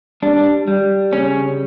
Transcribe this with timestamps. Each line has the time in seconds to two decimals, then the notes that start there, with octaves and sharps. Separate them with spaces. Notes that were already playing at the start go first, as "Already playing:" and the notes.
0.22 G3 D4
0.68 G3
1.12 C#3 C#4